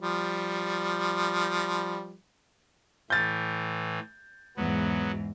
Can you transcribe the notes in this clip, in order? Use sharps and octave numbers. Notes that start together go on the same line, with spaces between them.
F3 G3
A2 E3 G6 A6
E2 G#2 F#3 B3